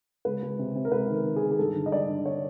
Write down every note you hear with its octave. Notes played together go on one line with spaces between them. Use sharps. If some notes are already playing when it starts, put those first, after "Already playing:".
C#2 B4
C#2
C3
C3
A#4
C#2 B4
D#3
A#4
D#3
G#4
D#3
G#4
G2 A4
D3
D#5
G2 D5
D3
C#5